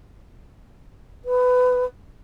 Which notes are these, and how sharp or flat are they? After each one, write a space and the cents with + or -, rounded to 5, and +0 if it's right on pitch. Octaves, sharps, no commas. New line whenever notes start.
B4 +20